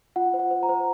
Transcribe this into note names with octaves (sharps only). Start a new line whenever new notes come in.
F4 F#5
C5
F#5
C5
A#5
C5